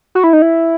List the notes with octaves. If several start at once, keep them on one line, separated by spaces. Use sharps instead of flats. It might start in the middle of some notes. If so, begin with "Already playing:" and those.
F#4
E4
D#4
E4